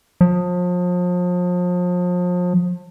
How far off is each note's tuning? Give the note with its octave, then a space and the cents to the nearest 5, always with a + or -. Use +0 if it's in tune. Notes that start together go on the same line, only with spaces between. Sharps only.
F3 +35